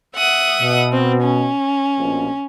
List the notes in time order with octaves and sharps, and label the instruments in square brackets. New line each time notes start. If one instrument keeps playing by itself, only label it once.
[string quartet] E5 F#5 D#6
[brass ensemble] B2
[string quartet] C4
C#4
[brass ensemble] A#1 B2 F3